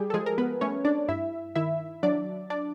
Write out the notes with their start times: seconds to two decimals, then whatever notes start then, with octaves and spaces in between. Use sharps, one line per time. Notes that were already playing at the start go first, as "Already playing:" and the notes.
Already playing: G3 G4 G#4
0.10 A4
0.14 F3 G#3 G#4
0.26 A#4
0.38 B3 B4
0.61 A3 C#4 C#5
0.85 D4 D5
1.08 G2 E4 E5
1.55 D#3 E4 E5
2.03 F#3 D4 D5
2.50 D4 D5